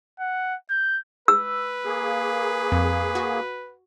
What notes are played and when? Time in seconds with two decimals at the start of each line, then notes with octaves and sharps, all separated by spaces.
0.20 F#5
0.70 G6
1.28 B4 E6
1.85 A#3 G#4
2.72 F2
3.15 F#4